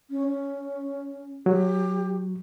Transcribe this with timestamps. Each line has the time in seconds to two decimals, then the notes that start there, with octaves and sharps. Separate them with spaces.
0.10 C#4
0.28 C#4
1.46 F#3 G4